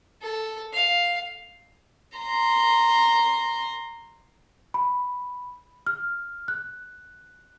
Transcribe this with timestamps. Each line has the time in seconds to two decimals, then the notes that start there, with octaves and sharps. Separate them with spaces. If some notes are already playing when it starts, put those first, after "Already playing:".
0.22 A4
0.73 F5
2.18 A#5 C6
4.74 B5
5.87 F6
6.48 F#6